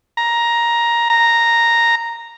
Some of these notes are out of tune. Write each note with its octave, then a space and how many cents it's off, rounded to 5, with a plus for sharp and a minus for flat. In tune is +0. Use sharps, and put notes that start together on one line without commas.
A#5 +10
A#5 -5